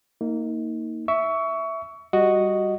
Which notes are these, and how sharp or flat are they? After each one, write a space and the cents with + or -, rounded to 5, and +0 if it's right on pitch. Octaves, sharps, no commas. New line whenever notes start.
A#3 -15 D#4 +25
E5 +0 C#6 +25
G3 +0 F#4 +0 D#5 +0